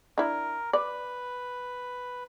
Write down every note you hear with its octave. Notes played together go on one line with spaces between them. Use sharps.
D4 E4 A#4
B4 D5